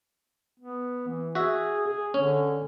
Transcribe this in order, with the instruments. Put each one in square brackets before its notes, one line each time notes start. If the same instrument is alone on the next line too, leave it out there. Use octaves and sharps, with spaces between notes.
[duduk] B3
E3
[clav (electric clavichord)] F#4 E5 [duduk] G#4
[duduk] G#4
[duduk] D3 [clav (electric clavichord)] C#4